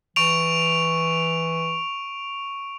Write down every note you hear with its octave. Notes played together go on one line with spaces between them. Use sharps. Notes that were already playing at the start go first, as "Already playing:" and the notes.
E3 C#6 D7 F7